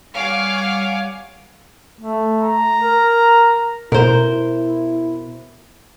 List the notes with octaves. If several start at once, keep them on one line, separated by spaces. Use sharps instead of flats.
G3 C#5 F5 F#5 G#5 D6
A3
A#5
A#4
B2 E4 A#4 C5